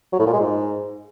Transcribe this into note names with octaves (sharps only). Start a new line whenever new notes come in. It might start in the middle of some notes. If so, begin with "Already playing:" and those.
F#3
A2
A#2
G#3
G#2